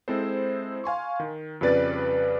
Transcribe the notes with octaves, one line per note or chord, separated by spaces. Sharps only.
G#3 C4 E4 A4 C5
F5 G#5 C6 C#6
D#3
F2 C#3 G3 B4 D5 A6